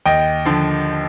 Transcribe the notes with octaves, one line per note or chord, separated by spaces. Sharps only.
D#2 D#5 G5
D3 F3